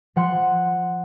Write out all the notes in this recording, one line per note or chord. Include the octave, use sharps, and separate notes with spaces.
F3 F#5 C6